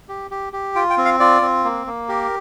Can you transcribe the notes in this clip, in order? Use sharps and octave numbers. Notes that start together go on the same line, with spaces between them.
G4
G4
G4
F4 G5
G5
C4
F5
F4 D5
C4
A#3
A#3
G4 A#4